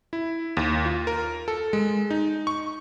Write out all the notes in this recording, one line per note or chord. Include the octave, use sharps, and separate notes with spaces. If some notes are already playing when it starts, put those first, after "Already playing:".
E4
D#2
F4
A#4
A4
G#3
D#4
C#6